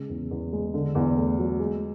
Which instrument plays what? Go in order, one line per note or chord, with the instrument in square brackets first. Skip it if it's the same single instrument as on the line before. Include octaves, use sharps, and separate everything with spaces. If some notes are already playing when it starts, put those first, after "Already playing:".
Already playing: [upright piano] C#3 G#3
E2
E2
G#3
D3
E2
A3
F#3
G#3